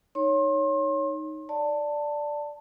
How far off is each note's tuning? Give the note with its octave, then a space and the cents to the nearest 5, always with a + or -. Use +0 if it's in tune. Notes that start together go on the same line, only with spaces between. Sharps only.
D#4 +0 C#5 +0 C6 +35
D5 +0 A5 +15